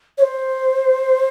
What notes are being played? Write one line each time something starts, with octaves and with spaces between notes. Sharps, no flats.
C#5
C5